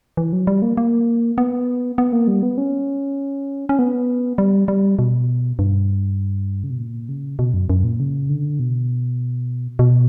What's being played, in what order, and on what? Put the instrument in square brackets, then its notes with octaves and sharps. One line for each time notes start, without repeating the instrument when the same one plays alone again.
[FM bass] E3
F#3
G3
A#3
A#3
B3
B3
A#3
G3
B3
C#4
C#4
B3
G3
G3
B2
G2
C#3
B2
A#2
C#3
B2
F#2
F#2
A#2
C#3
D3
B2
B2